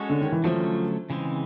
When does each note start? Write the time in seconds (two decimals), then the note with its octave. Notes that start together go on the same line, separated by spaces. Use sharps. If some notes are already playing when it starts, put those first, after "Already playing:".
Already playing: G#3 C#4 F#4 A4 C#5
0.10 D3
0.21 D#3
0.32 E3
0.44 D3 F3 F#3 A3 C#4
1.10 C#3 E3 G#3 C4